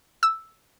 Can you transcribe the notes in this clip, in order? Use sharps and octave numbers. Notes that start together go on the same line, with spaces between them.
E6